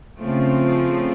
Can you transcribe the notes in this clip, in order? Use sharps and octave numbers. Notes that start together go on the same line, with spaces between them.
C#3 F3 A3 C4 F4